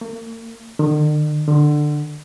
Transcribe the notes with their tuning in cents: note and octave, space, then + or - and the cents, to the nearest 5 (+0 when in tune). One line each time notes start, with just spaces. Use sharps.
A#3 -40
D3 +45
D3 +15